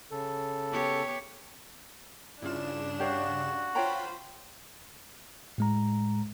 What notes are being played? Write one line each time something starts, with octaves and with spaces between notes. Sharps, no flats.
C#3 A4
B3 G4 C#5
G2 C#3 D4 E4 F4 E7
F#4 G4 C#5 F5
F4 C5 C#5 G5 A#5 B5
A2 G#3 A#5